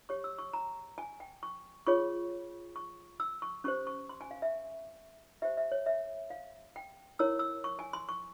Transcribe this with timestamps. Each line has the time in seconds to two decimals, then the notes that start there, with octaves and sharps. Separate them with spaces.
0.09 G4 C#5 C#6
0.24 E6
0.39 C#6
0.53 A#5
0.98 G#5
1.20 G5
1.43 C#6
1.87 F4 G#4 C#5 C#6
2.76 C#6
3.20 E6
3.42 C#6
3.64 C#4 G4 C5 C#6
3.87 C#6
4.09 C6
4.21 G#5
4.31 F5
4.42 E5
5.42 G4 C5 E5
5.57 E5
5.72 C#5
5.86 E5
6.30 F5
6.76 G5
7.19 E4 A#4 C#5 E6
7.39 E6
7.64 C#6
7.79 G#5
7.93 C6
8.09 C#6